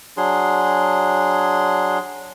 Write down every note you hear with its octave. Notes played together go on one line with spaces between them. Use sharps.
F#3 D4 G#4 C6